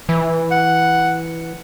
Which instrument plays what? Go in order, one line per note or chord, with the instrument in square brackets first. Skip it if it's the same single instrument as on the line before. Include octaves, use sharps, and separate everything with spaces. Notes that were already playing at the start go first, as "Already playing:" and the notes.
[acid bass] E3
[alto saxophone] F#5